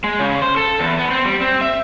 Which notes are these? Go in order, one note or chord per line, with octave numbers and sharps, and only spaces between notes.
G#3
C#3
C5
A4
E2
B3
C4
G3
C4
E5